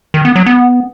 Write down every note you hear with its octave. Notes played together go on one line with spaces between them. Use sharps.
D#3
B3
F#3
B3